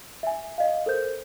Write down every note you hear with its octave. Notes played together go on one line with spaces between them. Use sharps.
E5 G#5
D#5 F5
A4 A#4 C5 G6